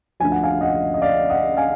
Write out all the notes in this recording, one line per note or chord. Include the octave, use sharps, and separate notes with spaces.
D2 D3 F3 G#5
F#5
F5 G#5
D#5 F#5
D#5
D5 F5
D#5 F#5
F5 G#5